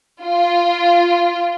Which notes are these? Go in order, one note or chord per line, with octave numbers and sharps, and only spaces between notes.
F4